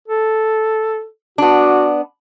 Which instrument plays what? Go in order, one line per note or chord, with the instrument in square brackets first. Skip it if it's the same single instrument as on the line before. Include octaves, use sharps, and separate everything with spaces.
[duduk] A4
[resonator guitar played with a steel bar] B3 D4 [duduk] F#4